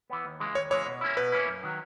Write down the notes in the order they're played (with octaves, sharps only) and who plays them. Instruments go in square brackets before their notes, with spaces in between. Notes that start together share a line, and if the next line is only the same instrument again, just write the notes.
[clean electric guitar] E3 B3
D#2
C#3 E3 G#3
[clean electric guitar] D#2 [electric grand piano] C#5
[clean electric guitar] C#3 E3 G#3 [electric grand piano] C#5
[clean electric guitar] B2
A#3 C#4 E4
[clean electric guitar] B2 [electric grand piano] B4
[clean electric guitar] A#3 C#4 E4
F#2
D#3 F#3